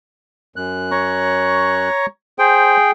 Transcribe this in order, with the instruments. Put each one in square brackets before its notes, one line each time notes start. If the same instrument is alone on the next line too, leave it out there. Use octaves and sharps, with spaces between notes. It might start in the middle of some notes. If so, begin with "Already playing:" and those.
[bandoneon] F#2 F#6
[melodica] C#5 A#5 C#6
[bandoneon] G#4 G5 [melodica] C5